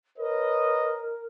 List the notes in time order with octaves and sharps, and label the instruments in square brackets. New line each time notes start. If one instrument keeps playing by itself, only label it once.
[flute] A#4 [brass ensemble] B4 C#5 D#5